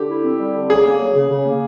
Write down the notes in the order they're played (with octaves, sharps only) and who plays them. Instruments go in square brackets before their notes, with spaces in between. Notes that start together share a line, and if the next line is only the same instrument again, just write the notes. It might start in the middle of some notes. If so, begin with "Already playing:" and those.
Already playing: [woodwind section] D3 [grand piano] G4
[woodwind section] E4
C4
G3
D3
[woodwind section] C#3 [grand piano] G#4
[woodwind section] A#3
F#3
C#3
C#3
A#3